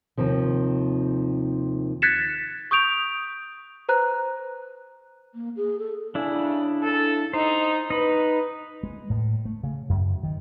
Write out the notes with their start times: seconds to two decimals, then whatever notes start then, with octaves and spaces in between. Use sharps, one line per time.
0.17 D#2 C3 D#3 F3
2.02 F#6 G#6 A6 B6 C#7 E7
2.71 C#6 D#6 G6 D7 F7
3.89 B4 C5 A#5 F#6
5.35 A#3
5.57 G#4
5.79 A4
6.15 C#3 D4 E4
6.82 C#3 A4
7.33 D#4 C5
7.90 D#4 B4 B5
8.83 G#3
9.10 A2
9.45 A3
9.63 C#3
9.89 F#2
10.23 D#3